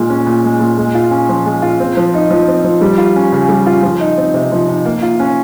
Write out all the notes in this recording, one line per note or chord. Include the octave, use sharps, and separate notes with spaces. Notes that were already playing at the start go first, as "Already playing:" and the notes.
Already playing: A#2 G#3
C#4
A#2
G#3
A#2
G#3
F4
C#4
F3
G#3
F4
C4
F3
D#4
F3
C4
F3
G3
F4
C#4
C#3
G3
F4
F3
D#4
C4
C3
F3
D#4
A#3
F4
C#4